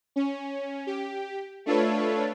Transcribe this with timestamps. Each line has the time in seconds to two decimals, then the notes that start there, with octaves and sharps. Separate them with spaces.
0.16 C#4
0.87 G4
1.66 A3 D4 F4 A4 B4 C#5